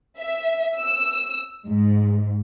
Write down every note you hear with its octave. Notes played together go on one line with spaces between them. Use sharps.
E5
E6
G#2